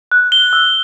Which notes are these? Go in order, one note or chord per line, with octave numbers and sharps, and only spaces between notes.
F#6
G7
E6